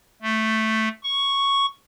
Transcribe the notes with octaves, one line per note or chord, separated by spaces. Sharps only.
A3
C#6